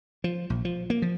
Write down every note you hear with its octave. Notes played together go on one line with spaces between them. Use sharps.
F3
A#1
F3
A#3
F3